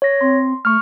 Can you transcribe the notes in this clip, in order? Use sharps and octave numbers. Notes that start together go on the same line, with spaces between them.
C#5 A#6
C4 C6
A3 C#6 F6